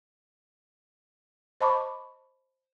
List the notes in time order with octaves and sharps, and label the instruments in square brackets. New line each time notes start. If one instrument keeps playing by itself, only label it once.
[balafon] C5 D#5 A5 B5 C#6 D6